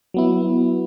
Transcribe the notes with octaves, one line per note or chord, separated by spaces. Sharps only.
F#3 B3 E4